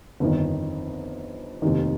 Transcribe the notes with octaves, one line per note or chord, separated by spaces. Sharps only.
G1 F2 D#3
F1 D#2 D#3